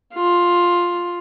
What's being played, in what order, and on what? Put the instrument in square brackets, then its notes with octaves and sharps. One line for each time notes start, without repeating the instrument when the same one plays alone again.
[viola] F4